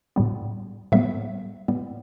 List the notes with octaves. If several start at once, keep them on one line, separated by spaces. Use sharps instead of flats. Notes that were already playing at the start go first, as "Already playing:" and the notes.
A2 G3 B3
A2 G3 B3 E5
A2 G3 B3